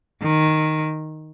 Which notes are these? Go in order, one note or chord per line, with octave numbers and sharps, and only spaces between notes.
D#3